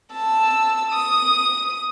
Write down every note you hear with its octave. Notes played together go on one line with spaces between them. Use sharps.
A5 E6
D#6